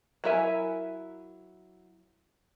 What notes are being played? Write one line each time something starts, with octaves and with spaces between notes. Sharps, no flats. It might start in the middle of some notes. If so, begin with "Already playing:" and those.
F#3 E4 A#4 E5 G#5